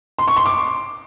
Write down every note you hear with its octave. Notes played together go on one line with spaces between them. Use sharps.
C6
C#6
C6
D6